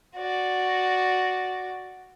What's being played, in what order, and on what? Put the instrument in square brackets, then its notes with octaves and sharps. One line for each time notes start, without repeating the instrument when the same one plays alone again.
[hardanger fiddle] F#4 D5